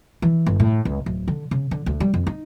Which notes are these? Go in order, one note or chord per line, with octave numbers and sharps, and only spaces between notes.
E3
G1
A2
C#2
D1
D3
C#3
D3
D2
G3
F2
D#4